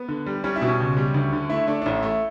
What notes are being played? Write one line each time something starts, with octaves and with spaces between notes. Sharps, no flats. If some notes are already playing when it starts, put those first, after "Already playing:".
Already playing: B3
D3
G3
G3 C#4
E4
B2
C#4
C#2
G3
D2
D3
A3 E4
A3 D4
D4
A1 E4
A3